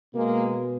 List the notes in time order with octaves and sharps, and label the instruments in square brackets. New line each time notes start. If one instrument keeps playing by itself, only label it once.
[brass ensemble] B2 G#3 A#3